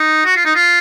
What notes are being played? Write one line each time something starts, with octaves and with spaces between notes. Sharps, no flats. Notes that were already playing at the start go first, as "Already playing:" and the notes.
Already playing: D#4
F#4
F4
D#4
F4